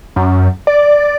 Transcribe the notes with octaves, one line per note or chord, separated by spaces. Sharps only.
F#2
D5